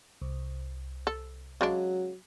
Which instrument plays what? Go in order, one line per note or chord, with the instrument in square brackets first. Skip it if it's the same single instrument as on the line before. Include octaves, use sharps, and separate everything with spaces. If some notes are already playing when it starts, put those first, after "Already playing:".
[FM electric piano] C2
[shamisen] A4
[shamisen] C#3 G#3 D4 [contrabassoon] F#3